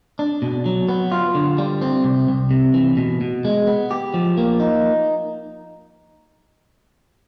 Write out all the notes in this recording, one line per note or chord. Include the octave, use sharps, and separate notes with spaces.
D4
B2
F#3
B3
F4
D3
G3
C4
C2
C2
C3
E3
B2
B2
G#3
B3
G4
F3
A#3
D#4